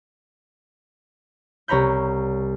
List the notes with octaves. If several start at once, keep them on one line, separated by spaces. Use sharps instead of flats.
C2 C#5 A#5 B5 G6